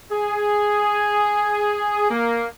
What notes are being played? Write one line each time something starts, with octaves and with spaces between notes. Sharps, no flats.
G#4
A#3